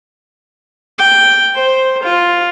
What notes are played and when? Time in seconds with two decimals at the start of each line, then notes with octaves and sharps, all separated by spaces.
0.98 G5
1.55 C5
2.03 F4